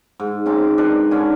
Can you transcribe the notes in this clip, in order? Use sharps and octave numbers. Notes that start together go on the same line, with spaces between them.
G#2
C4 C#4 A#5 D6
D4 A#4 B4
D3 C#4 D#4 G#5